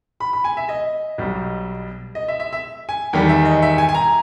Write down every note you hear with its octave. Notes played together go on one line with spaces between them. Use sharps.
B5
B5
G#5
E5
D#5
B1 B2 G3
D#5
E5
E5
E5
G#5
E2 D#3 G3 G5
E5
D#5
E5
G#5
G#5
A#5